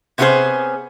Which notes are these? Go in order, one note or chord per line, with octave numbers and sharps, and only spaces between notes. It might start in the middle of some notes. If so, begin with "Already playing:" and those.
C3 B3 C#4 F4 G#4 C5